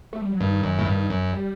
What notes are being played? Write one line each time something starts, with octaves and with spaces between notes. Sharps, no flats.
A3
G3
F#3
G2 D#3
F#2
A2
G2
F#2
G3